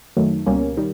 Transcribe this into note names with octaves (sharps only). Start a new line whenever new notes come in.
F#2 D#3 F#3 A3
C#2 B2 G3 A#3 C#4
D#3 G3